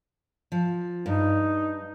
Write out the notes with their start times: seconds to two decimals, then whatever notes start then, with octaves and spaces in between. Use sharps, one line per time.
0.52 F3
1.06 G2 D#4